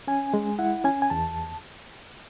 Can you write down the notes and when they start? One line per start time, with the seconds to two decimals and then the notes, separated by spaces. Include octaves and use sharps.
0.07 C#4 G#5
0.34 G#3
0.59 E4 F#5
0.84 C#4 G#5
1.02 G#5
1.10 E2 A5